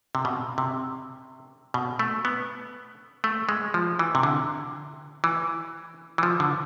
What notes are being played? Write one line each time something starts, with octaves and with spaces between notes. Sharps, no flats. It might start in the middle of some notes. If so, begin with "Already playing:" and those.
C3
B2
C3
B2
A3
B3
A3
G#3
F3
E3
C3
D3
E3
E3
F3
D3